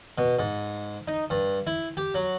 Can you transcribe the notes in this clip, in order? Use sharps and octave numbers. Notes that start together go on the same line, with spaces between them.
B2
G#2
D#4
G2
E4
G4
F#3